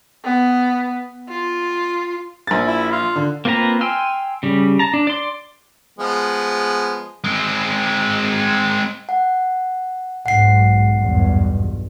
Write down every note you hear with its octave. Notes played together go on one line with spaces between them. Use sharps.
B3
F4
A#1 A6
E4
F4
D3
A#3 C4 F4 B4 A#5
G5 G#5 C6 E6 F6
C#3 G3
A5 A#5
D4
D5 C6
F3 G#3 B3
G#3 C4
F#5
B1 G#2 F#5 C7
B1 E2 G2